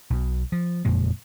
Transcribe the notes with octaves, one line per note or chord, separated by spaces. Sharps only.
B1 B2
F3
F#1 F2 A#2 G#3